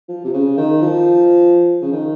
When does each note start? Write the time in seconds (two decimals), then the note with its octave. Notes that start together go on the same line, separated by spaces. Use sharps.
0.09 F3
0.24 C3
0.33 C#3
0.57 D#3
0.82 F3
1.82 C#3
1.92 D#3